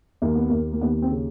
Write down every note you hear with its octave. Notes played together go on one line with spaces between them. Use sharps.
D#2 A#3
B3
D#2 A#3
A#3
D#2 B3
C4
C#3